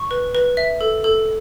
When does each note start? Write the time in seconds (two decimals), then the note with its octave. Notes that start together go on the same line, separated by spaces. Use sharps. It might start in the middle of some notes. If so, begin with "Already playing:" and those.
Already playing: C#6
0.11 B4
0.35 B4
0.57 E5
0.81 A4
1.04 A4